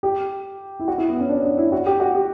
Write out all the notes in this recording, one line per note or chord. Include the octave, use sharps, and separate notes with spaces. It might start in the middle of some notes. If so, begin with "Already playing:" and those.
G4
E4
F#4
E4
B3
C#4
D4
D4
E4
F#4
G4
F#4
G4